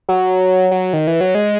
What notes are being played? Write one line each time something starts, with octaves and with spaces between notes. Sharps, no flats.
F#3
F#3
D#3
E3
F#3
G#3